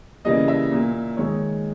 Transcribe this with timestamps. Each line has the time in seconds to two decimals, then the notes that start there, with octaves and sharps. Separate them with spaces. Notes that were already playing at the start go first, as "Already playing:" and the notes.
0.25 C#3 E3 G3 A#3 D#5
0.48 E5
0.71 A#2 A#3
1.17 D#3 G#3 C#5